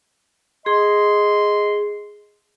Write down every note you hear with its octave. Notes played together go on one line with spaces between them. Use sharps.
G#4 D#5 C6